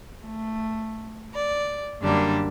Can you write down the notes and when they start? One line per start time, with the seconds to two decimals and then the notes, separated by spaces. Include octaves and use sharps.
0.25 A3
1.34 D5
2.01 F#2 D3 G3 A#3 D4